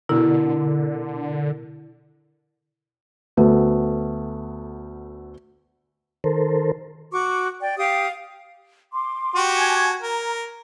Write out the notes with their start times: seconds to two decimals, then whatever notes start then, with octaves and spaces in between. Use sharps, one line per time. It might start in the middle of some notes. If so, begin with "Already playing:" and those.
0.09 B2 D3 E4 A#4
3.37 D2 A3 B3
6.24 D#3 A4 A#4 C5
7.12 F#4 C#6 D6
7.61 D5 G5
7.77 G4 F5 G5 D#6
8.93 C6 D6
9.35 F#4 G4
9.56 G#5 A5 G#6
10.01 A#4 A#5